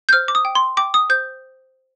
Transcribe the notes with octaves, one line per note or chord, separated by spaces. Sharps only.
G6
C5 F6
D6
D#6
G5
C6
G5 D6
D#6
C5 G6